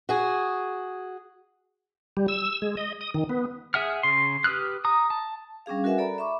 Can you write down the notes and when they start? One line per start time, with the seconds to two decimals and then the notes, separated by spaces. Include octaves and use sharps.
0.09 F#4 G#4
2.17 G3
2.28 E6
2.62 G#3
2.77 D#5
3.01 D#6
3.14 D#3
3.29 B3
3.74 G#4 E5 F#5 F6
4.03 C#3 C6
4.44 G4 B4 D#6 F6 F#6
4.85 A#5 D#6
5.10 A5
5.66 G3 C#4 D4 G#4 F5
5.84 F#4 A#4 B4 E5 F#5 G#5
5.98 A4 D5 A#5 B5
6.18 E5 B5 C#6 D6